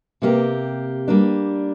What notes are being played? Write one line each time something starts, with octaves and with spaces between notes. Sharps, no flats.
C3 A#3 G4
G3 A#3 D4